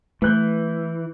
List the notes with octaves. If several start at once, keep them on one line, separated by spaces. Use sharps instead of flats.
E3 A3 B4 F#6 G6